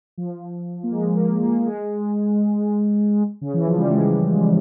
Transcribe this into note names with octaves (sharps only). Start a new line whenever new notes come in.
F3
A#3
G#3
A#3
A#3
G#3
C#3
E3
F3
G3
G#3